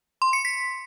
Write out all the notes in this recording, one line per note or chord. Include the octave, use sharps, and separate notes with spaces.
C6
C#7
B6